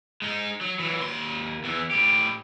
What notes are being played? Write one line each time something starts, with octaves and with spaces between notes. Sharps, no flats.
G#3 D#4
F#3
E3 F#3
D#2 C6
E2 E3
A2 G4